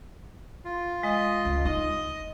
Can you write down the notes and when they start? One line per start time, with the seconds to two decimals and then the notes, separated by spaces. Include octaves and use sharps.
0.65 F4
1.03 G#3 D#5
1.45 C#2
1.65 D#4 D#5